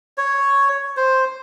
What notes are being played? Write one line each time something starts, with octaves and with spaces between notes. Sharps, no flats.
C#5
C5